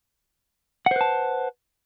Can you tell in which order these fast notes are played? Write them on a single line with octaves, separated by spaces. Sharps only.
F#5 C5 B4 A5